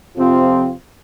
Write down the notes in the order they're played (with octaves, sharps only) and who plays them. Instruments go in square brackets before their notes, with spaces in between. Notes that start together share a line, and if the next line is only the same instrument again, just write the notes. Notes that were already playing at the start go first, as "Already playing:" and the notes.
[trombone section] F2 C3 F3 C4 F4